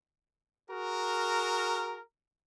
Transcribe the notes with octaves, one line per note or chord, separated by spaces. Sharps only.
F#4 G#4 A#4